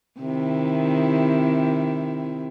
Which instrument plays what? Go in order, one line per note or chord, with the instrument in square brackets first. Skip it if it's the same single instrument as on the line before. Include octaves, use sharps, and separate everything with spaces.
[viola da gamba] C3 D#3 E4